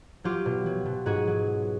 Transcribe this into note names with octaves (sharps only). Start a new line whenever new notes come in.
F#3 F4 G4
B2
F#3
B2
G#2 F#4 G#4
F#3